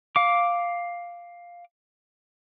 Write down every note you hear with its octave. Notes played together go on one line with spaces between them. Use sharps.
F5 D6